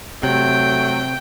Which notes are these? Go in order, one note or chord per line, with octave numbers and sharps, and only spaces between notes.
C3 F#3 A3 G5